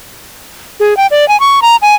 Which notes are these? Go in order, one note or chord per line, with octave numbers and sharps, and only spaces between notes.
G#4
G5
D5
G#5
C#6
A#5
G#5